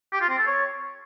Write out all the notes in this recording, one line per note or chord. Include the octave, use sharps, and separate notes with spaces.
G4
F4
C4
A4
C#5